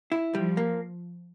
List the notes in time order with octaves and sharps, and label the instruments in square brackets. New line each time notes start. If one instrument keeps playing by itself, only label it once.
[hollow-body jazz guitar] E4
[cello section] F3 [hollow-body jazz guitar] G3
[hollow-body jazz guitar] A#3